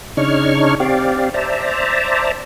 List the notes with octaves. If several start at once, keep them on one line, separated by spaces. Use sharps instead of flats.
C#3 D4 D#4 C#5 C#6 F6
C4 G4 D5 F5
C5 D5 E5 A5 A#5